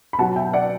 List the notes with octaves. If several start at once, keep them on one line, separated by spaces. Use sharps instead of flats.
B5
B2 F#3 F#5 A5
E5 G5
D5 F#5